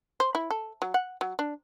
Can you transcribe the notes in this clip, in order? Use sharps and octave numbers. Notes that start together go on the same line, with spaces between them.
C5
E4
A4
F#3
F#5
F#3
D4